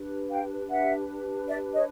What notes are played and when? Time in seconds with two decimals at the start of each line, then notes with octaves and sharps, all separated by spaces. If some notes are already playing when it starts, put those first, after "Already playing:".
Already playing: D4 G4 B4
0.30 F5 G5
0.70 E5 F#5
1.48 D5 E5
1.75 C#5 D#5